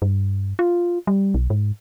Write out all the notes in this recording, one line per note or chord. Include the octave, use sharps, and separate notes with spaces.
G2
F4
G3
B1
G#2